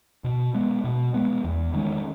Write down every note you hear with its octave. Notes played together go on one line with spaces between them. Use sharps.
B2
G#3 B3
B2
G#3 B3
E2
D#3 G#3 C#4